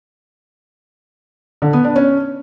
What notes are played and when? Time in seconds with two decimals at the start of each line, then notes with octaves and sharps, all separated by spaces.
1.62 D3
1.73 B3
1.84 D4
1.96 C#4